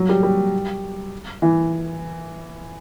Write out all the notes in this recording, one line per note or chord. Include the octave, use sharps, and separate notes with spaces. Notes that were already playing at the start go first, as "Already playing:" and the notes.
Already playing: F#3
G3
G3
E3